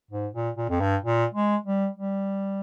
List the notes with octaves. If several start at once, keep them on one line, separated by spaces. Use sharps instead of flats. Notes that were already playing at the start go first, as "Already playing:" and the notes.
G#2
A#2
A#2
F2
G2
A#2
G#3
G3
G3